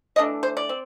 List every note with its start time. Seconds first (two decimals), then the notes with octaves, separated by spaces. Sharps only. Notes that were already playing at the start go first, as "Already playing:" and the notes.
0.16 E3 A3 D4 D#5
0.43 C5
0.57 D5
0.69 C4